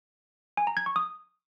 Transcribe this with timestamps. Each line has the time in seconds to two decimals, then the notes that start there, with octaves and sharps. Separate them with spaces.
0.57 G#5
0.67 A#5
0.77 G#6
0.86 C#6
0.96 D#6